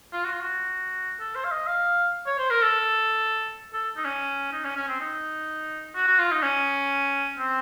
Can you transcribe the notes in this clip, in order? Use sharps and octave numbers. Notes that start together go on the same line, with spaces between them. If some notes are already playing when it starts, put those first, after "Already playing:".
F4
F#4
F4
F#4
A4
C5
F5
D#5
F5
C#5
C5
A#4
A4
A4
D#4
C#4
D#4
C#4
C#4
C4
D#4
F#4
F#4
F4
D#4
C#4
C4